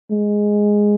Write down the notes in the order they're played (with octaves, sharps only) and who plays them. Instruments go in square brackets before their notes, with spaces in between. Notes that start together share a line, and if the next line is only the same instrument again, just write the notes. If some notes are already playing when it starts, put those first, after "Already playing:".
[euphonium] G#3